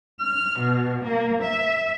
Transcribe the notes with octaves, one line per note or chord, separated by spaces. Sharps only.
F6
B2
A#3
E5